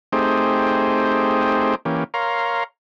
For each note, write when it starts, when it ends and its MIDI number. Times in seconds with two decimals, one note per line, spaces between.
0.13 1.75 57
0.13 1.75 60
0.13 1.75 63
0.13 1.75 67
0.13 1.75 68
0.13 1.75 72
1.85 2.04 52
1.85 2.04 58
1.85 2.04 61
1.85 2.04 67
2.14 2.64 70
2.14 2.64 73
2.14 2.64 77
2.14 2.64 82
2.14 2.64 84